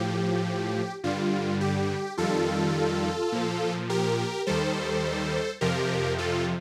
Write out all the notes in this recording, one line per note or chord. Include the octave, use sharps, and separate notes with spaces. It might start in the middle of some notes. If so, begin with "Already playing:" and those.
Already playing: A2 F3 G4
G2 D3 G3 F4
G4
F2 D#3 G3 F4 A4
A#2 F3
G4 A#4
D#2 D#3 G3 A4 C5
F2 C3 F3 G4 A#4
F4 A4